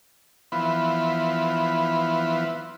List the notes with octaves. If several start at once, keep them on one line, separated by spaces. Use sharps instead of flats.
E3 F3 B3